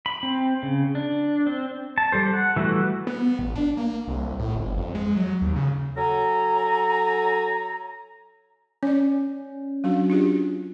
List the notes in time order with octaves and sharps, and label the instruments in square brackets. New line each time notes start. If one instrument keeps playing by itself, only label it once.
[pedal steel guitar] B5
C4
C#3
D4
C4
A5
G3 A4 C5
F#5
E3 G3 A3 F#4
[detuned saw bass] B3
A1
D4
A#3
C2
A2
G1
F2
G#3
F#3
D#2
C#3
[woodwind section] F#3 A4 G#5 A#5
[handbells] C#4 [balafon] C#5 D5
[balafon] F#3 D4 F#4
D4 F4 G4